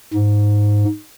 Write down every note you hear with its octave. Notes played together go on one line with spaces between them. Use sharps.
G#2